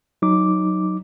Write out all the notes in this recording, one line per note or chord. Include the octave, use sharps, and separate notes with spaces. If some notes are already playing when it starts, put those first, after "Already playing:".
F#3 D#4 D6